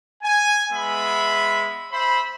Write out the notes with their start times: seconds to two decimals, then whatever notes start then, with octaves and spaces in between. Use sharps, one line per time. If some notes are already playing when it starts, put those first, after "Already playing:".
0.22 G#5
0.72 G#3 B3 E5 B5
1.91 C5 E5 B5